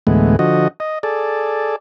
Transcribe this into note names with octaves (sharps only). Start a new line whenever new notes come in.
D2 A2 E3 G#3 B3
D3 F3 F#4 D#5
D#5
G#4 A4 D5